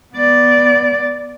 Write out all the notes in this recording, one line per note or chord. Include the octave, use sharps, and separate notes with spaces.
B3 D5